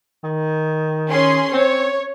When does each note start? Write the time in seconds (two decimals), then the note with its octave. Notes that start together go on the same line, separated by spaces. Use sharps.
0.24 D#3
1.10 C#4 G#4 C6
1.53 C4 C#5